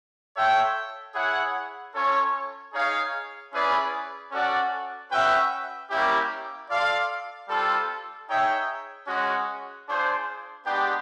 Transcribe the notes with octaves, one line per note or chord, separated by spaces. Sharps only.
F4 A4 C#5 E5 G5
E4 G#4 C#5 F#5
C#4 F4 A4 C#5
D#4 G#4 C#5 F5
C#4 E4 G#4 B4 D5
C#4 F#4 A4 D5 F#5
C#4 F#4 B4 E5 G5
G3 A#3 C#4 E4 G4
F4 A4 D5 F5
G3 C4 F4 A4
D#4 G#4 C#5 E5 G5
G#3 C#4 F#4
D4 F4 G#4 C5
G#3 B3 D4 G4